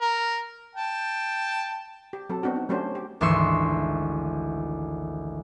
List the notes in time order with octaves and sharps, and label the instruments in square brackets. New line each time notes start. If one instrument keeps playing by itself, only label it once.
[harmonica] A#4
G5 A5
[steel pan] G4
F#3 C4 A4
B3 C4 D4 F#4
D#4
F#3 A3 C#4 D4 G4 C5
G4
[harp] G#1 D2 E3 C6 C#6 E6